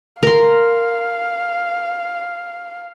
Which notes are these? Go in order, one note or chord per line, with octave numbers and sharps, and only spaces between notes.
A#4 F5 C6